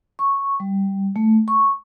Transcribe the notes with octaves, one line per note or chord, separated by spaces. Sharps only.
C#6
G3
A3
C#6